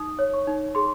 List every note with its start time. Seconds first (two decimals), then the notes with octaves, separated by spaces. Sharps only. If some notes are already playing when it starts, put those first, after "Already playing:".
Already playing: D#4 D#6
0.19 C#5
0.34 C#6
0.47 D#4
0.75 G#4 C6